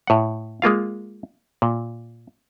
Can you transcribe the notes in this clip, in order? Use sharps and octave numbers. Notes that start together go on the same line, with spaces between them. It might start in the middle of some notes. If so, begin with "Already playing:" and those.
A2 F#5
G#3 A#3 F4 F5
A#2